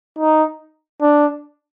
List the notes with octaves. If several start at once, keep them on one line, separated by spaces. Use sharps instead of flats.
D#4
D4